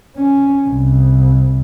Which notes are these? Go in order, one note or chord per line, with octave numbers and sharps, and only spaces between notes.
C#4
C2